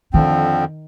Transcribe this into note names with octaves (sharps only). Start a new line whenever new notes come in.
F2 D3 D#3 F3 C4